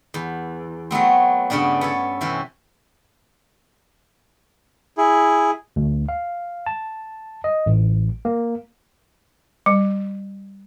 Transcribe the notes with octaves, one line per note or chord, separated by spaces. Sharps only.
E2
F#3 A3 B3 C4
G2 C#3 B3 C#4 D4
B3 A4 C#5
C3 E3 C#4
E4 G#4
D2
F5
A5
D#5
A1
A#3
G3